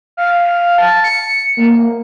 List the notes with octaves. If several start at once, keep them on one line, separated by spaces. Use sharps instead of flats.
F5
A5
C#7
A#3